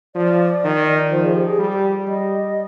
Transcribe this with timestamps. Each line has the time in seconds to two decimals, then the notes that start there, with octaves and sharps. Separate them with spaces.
0.15 F3 D5
0.64 D#3
1.11 F3 C5
1.24 G#4
1.35 G4
1.47 G#4
1.59 G3
2.07 G3 D#5